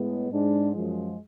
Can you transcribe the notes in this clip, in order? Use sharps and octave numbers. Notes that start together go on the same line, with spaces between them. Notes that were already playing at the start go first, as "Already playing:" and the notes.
Already playing: A2 G#3 B3
G#2 G#3 D4
F#2 F3 G#3